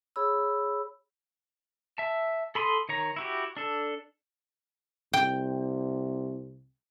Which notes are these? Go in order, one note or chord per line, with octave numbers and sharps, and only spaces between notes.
G#4 C#5 B5 E6
E5 A5
A4 B5 C6 D#6
D#3 C#5 A#5
E4 F#4 G4
D4 A4
C2 G5